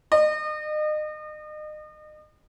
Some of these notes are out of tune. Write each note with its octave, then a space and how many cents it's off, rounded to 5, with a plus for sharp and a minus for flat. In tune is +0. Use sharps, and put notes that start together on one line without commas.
D#5 -35